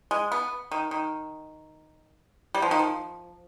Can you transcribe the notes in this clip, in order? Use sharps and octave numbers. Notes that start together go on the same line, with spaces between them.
G#3
B3
D#3
D#3
G3
F3
D#3
F3